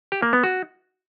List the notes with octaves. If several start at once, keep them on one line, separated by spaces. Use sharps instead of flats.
G4
A#3
B3
F#4